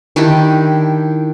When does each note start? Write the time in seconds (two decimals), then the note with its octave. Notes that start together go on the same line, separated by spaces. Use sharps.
0.16 D#3 D4 E4 G4